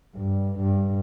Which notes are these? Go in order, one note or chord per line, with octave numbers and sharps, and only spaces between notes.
G2
G2